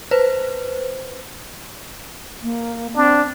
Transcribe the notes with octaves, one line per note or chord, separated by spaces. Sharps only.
B4 C5
A#3
C4 D4